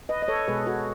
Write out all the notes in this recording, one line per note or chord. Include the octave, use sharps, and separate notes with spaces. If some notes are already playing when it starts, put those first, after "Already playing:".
B4 D#5
D#5
A4 C#5
B2 G#3 G#4 B4
F#4 A4